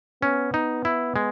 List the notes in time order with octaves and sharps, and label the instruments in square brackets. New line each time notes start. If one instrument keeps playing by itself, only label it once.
[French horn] B3 [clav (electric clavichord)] C#4
[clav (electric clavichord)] D#4
E4
G#3